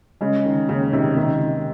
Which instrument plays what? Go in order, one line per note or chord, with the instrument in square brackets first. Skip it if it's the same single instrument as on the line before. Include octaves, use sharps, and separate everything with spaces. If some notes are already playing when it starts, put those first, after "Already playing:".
[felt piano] C#3 [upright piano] G#3
[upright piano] D#3
[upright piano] D#2 [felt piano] C#3
[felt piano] C3 [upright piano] D#3
[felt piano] C3 [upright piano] D#3
[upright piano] D#3